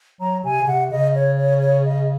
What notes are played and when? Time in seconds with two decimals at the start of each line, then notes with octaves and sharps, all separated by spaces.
0.20 F#3 A#5
0.44 C3 G#5
0.61 C#3
0.67 C3 F#5
0.91 C#3 D#5
1.15 C#5
1.37 C#5
1.61 C#5
1.85 D#5